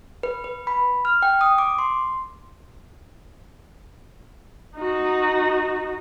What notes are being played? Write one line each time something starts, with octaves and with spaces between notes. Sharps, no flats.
B4
B4
B5
F6
G5
D#6
D6
C6
D#4 F#4